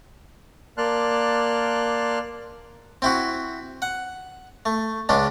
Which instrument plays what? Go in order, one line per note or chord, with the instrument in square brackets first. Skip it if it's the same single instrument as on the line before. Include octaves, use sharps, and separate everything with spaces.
[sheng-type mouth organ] A#3 D5 A5 C6 F6 F#6
[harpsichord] C4 E4 F#4
F#5
A3
C#2 G#3 C#4 D4